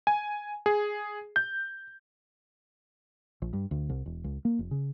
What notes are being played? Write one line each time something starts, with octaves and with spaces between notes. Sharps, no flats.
G#5
G#4
G6
A#1
G2
D2
C2
E1
C#2
A#3
F1
C#3